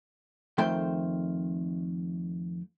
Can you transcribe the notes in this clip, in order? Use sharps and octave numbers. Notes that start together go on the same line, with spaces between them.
F2 D#3 A3 C5 G5 C6